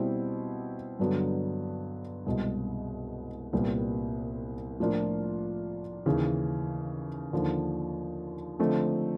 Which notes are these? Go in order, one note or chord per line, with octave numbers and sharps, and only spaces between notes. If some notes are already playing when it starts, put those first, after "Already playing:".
Already playing: B2 G3 C4 E4
G2 D3 F#3 B3
C2 B2 G#3
C2 A#2 G3 B3
A2 F3 A#3 D4 F4
D#2 C#3 E3
D#2 D3 F3
D3 F3 A3 C4 D#4